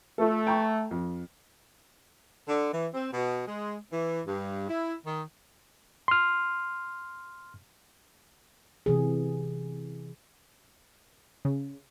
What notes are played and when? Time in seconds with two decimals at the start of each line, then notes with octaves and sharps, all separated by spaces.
0.18 A3 F4 A4
0.47 G5 A#5 C#6
0.91 F2
2.49 D3
2.73 E3
2.94 C4
3.13 B2
3.47 G#3
3.92 E3
4.26 G2
4.69 E4
5.05 D#3
6.08 C6 F6
8.86 C3 E3 G#4
11.45 C#3